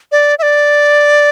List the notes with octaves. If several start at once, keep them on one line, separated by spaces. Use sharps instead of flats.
D5
E5
D5